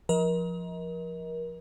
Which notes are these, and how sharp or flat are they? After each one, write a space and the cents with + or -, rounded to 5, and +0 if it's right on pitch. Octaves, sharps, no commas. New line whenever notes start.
F3 +0 A#4 +30 D#5 +35